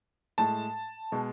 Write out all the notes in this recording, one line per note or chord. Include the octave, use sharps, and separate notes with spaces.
A2 G#3 A5
B2 G#3